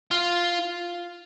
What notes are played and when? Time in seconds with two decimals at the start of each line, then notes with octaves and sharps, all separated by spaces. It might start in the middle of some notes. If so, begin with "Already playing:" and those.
0.11 F4